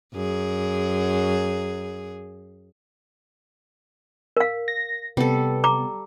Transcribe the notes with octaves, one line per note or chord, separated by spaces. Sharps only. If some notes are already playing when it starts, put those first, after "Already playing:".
F#2 G#4
A#4 F5
A#6
C3 G3 B3 A4
A#5 D6